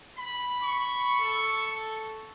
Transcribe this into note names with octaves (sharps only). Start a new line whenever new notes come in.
B5
C#6
A4